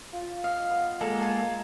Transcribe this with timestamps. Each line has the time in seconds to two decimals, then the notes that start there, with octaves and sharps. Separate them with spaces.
0.13 F4
0.44 D#5 F5
0.71 B3
1.01 G#3 A#3 A4
1.20 F4 A4 G#5